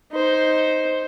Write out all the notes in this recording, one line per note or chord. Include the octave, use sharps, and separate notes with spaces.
D#4 C5